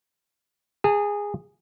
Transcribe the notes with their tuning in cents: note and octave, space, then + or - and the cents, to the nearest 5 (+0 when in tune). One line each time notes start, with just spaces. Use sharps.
G#4 -15 A5 +35